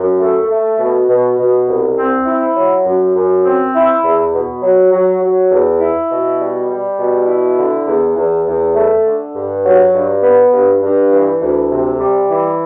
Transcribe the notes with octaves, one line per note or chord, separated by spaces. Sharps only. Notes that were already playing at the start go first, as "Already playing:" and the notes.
Already playing: F#2
A3
A3
B2
B2
B2
C2
C4
E4
F#3
F#2
F#2
C4
E4
E2
B2
F#3
F#3
F#3
E2
E4
B2
G3
G3
B2
E4
D3
E2
E2
E2
A3
D3
G2
F#3
G2
B3
G2
G2
E3
D2
C3
G3
E3